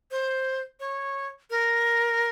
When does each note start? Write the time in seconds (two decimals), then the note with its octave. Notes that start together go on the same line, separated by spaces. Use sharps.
0.11 C5
0.80 C#5
1.50 A#4